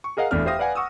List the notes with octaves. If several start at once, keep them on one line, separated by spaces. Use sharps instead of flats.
C#6
G#4 A#4 D#5 F5 F#5
E1 E2 A3 D4 F6
G4 C5 E5 F5 D#6 A#6
B4 D5 F5 F#5 G#5
F#5 C#6 D#6 E6